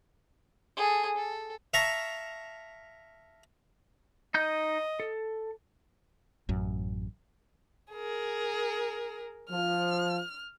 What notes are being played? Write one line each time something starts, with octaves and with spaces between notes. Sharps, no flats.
G#4 A4
A4
E5 F5 A5 A#5 C#6
D#4 D#5 G6
A4
A1 F#2
G#4 A#4
F3 F6